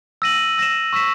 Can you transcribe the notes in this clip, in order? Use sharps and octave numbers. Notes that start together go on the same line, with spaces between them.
E6 A#6 D#7 F#7
E6 A#6 E7
C#6 E6 B6 E7